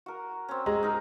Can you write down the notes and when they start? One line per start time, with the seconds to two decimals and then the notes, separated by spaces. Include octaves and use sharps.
0.06 F#4 A#4
0.48 C4 C#4
0.66 G#3 A#5
0.83 D#4 A#4